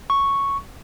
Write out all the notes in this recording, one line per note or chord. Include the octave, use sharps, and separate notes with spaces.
C#6